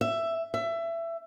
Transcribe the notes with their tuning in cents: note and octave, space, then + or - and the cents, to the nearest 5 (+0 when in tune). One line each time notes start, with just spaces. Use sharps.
E5 +10
E5 +20